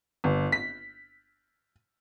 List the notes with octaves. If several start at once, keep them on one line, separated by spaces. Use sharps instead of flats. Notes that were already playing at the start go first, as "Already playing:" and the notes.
G1
B6